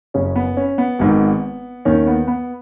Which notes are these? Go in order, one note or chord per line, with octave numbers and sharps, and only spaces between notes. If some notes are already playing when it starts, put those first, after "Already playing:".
F#1 F#2 C#3 C#4
B3
C#4
B3
G#1 G#2 D#3
D#2 D#3 C#4
B3
B3